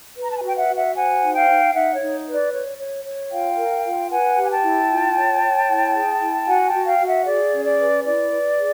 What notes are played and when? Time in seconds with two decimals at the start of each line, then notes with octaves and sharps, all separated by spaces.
0.17 B4
0.23 A#5
0.30 A5
0.39 G#5
0.43 F#4
0.48 G5
0.56 E5 F#5
0.69 F#4
0.75 E5 F#5
0.95 C5 F#5 G#5
1.22 D#4
1.35 F5 G5
1.48 D#4
1.74 D#4 E5 F#5
1.94 C#5
2.01 D#4
2.27 B4
2.33 D5
2.53 C#5
2.79 C#5
3.05 C#5
3.31 F4 F5 G5
3.58 A#4
3.84 F4
4.10 B4 F#5 G#5
4.37 G4
4.42 G#5
4.50 G5 A5
4.63 E4
4.89 F4
5.16 C#5
5.42 C#5
5.68 E4
5.94 G#4
6.20 E4
6.47 F#4 F#5 G#5
6.66 G5 A5
6.73 F#4
6.86 F5 G5
6.99 F#4
7.06 E5 F#5
7.26 G#4 D5
7.52 C#4
7.66 D5
7.78 B4
8.04 E4 D5
8.31 B4
8.57 G#4